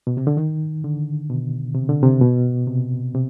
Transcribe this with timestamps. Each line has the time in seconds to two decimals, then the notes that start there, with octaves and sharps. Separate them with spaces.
0.07 B2
0.17 C3
0.27 D3
0.37 D#3
0.84 D3
1.30 B2
1.75 C3
1.89 D3
2.03 C3
2.21 B2
2.67 C3
3.14 C3